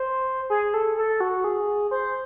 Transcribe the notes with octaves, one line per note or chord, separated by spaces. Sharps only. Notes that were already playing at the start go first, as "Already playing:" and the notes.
Already playing: C5
G#4
A4
A4
F#4
G#4
C5